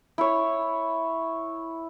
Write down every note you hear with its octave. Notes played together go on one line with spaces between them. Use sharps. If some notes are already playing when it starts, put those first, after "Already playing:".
E4 C#5